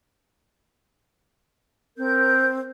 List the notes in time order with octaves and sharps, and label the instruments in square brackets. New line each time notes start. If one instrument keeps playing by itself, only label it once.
[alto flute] C4 [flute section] A#4 G6